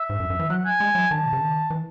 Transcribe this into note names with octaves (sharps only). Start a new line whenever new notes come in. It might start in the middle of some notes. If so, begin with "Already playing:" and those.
Already playing: E5
G#2
F#2
F#2
E3
F#3 F#5
G#5
G#3
F#3
D#3 A5
B2
C#3
D#3
E3